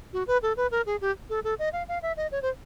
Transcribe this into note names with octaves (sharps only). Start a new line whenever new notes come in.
F#4
B4
A4
B4
A#4
G#4
G4
A4
A4
D#5
F5
F5
E5
D#5
C#5
C5